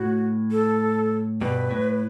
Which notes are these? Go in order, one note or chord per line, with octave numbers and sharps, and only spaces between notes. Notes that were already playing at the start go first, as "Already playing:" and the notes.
Already playing: A2 F#4
A4
G2 B2 B4
A2